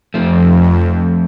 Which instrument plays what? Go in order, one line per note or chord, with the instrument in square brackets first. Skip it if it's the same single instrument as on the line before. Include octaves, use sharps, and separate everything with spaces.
[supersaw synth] F2 [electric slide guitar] F3 A3 C4